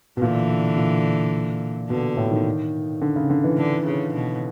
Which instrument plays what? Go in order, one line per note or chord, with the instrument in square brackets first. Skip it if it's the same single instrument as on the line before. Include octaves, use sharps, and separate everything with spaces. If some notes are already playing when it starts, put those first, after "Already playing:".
[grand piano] B2
[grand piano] A#2 [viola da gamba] D3 E3
[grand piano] A#2
[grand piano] B2 [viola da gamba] D3
[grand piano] A2
D#3
D3
C#3
D3
E3
[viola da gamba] D3
C#3
B2